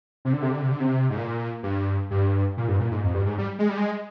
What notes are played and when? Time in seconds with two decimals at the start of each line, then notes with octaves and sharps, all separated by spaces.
0.25 C3
0.33 D3
0.42 C3
0.52 D3
0.62 C3
0.71 D3
0.80 C3
1.10 G#2
1.17 A#2
1.63 G2
2.11 G2
2.57 A#2
2.68 G2
2.79 A#2
2.92 G#2
3.04 F2
3.14 G2
3.26 G#2
3.38 G3
3.59 G#3
3.69 G3
3.77 G#3